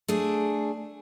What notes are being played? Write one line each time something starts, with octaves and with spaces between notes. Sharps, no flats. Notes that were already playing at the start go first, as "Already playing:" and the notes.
A3 D4 G#4